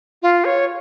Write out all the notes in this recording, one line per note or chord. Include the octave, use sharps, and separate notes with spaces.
F4
C#5